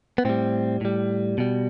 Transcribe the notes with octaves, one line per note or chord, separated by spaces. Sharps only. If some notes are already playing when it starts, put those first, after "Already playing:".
B3
A2 G3 C4
A2 G3
B2 G3